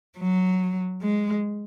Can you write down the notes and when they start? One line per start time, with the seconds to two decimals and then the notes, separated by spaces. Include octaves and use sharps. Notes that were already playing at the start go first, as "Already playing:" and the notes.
0.18 F#3
1.03 G#3